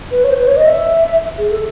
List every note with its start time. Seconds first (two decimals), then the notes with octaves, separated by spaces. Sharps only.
0.11 B4
0.24 C#5
0.30 C5
0.38 B4
0.47 C#5
0.57 D#5
0.66 E5
1.38 G#4
1.50 A4